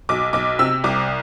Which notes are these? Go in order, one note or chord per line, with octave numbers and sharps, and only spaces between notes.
B1 D6
B1 D6
C3 E6
C2 D6